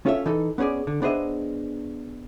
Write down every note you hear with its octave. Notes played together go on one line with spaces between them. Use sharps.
C#4 F4 A4 C#5 E5
E3 D#4 A4
B3 C#4 D#4 G#4 D5
D3
B3 D4 G#4 C5 D#5 E5